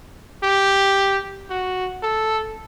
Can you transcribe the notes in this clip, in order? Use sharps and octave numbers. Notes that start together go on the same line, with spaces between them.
G4
F#4
A4